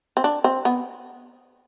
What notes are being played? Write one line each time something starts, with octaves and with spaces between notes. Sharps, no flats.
C4
D4
C4
B3